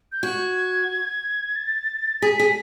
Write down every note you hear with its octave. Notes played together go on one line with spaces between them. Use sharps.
G6
F#4 G#6
A6
G#4 B6
G#4